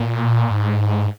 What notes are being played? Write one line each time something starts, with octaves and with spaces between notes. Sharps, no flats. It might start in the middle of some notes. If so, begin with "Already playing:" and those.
Already playing: A#2
G#2